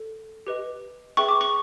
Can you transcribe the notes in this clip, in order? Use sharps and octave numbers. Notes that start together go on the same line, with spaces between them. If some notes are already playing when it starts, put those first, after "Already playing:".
Already playing: A4
G4 B4 D#5
G#4 B4 E5 G5 C#6
D6
C#6